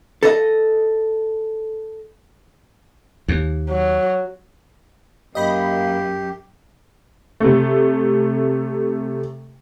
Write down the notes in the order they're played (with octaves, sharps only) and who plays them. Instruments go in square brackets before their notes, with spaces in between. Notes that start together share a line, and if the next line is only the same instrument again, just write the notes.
[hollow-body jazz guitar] A4 D#5
[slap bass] D#2
[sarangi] F#3
[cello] F#2 [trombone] A#3 [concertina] G4 [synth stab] D#5 B5
[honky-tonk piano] C3 A3